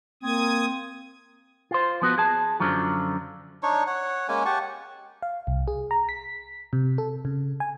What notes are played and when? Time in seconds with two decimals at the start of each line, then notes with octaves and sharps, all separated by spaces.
0.23 A#3 C4 D#6 G#6
1.71 F4 C5
2.02 F3 B3 F#4
2.18 G#4 A5
2.60 F#2 B2 D3 F3 F#3 F4
3.63 D4 D#4 C#5 C#6
3.87 C#5 F#5
4.28 G#3 A#3 C#4 G#5
4.45 G4 F#5 A5 C#6
5.23 F5
5.47 C2
5.68 G#4
5.91 A#5
6.09 B6
6.73 C3
6.98 A4
7.25 C#3
7.60 G#5